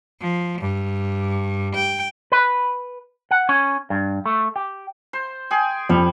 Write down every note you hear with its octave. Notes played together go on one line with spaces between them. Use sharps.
F3
G2
G5
B4
F#5
C#4
G2
A3
G4
C5
G#4 G5
F2 G3